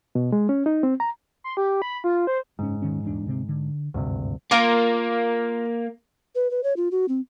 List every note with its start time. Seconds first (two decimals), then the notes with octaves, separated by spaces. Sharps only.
0.15 B2
0.32 G#3
0.49 C#4
0.66 D#4
0.83 C4
1.00 A#5
1.44 C6
1.57 G4
1.82 B5
2.04 F4
2.27 C5
2.59 F#1 G#2 C#4
2.82 D#1 D#3 C#4
3.02 D#1 E2 D4
3.26 D2 C3 C4
3.49 D3
3.94 G#1 D2 G2 C3
4.51 A#3 F4 A#4 D6
6.35 B4
6.51 B4
6.63 C#5
6.77 F4
6.92 F#4
7.08 C4